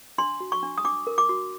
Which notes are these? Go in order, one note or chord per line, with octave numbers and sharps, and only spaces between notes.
D4 C6
F#4
C#6
D4
D#6
D4 D6
A#4
D6
F#4